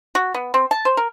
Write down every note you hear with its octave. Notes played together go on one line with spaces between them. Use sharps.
F#4
B3
C4
A5
C5
A#4